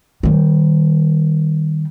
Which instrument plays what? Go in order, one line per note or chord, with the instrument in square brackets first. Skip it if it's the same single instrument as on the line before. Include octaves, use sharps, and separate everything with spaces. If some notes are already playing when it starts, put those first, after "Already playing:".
[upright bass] D#3 G3